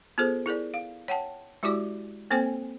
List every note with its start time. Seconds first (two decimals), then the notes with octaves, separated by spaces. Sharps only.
0.18 B3 F4 G#4 A4 C5
0.46 E4 G#4 A#4 D5
0.74 F5
1.08 C#5 F#5 G5 A5
1.63 G#3 E4 F#4 G4 D5 D6
2.31 A#3 C4 A4 C5 G5 G#5